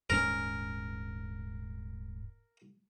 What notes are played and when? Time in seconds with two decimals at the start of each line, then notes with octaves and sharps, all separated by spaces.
0.10 D#1 G#2 C#4 A#4